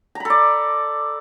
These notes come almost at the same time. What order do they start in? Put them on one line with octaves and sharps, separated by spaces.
A#5 B5 A4 D5